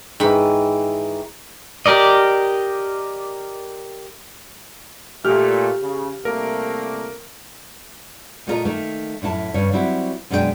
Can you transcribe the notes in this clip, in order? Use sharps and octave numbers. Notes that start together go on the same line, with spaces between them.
G#2 D#3 E3 B5
G4 A#4 D5 D#5
A#2 A3 G4 F6
C#3
C2 A3 A#3 A#4
A#2 A3 F4 F#4 A#4 D#5
D#3 A3 A#3
F#2 A2 E4 A5
G2 C#3 C#5
F#3 G3 C4 E4 F#4
F#2 B2 G#3 D4 F#4 G5